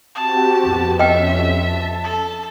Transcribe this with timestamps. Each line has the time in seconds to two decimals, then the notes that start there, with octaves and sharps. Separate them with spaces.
0.15 C4 F#4 G4 A5
0.63 F2 B3
0.99 C#4 D#5 E5 G5
1.51 A5
2.04 A4